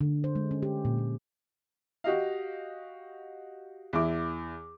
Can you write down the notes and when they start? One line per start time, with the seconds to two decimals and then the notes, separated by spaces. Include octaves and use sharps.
0.01 D3
0.24 C5
0.36 G#3
0.51 C#4
0.63 G4
0.85 A#2
0.98 A#2
2.04 F#4 G4 D#5 F5
3.93 E2 E4 D6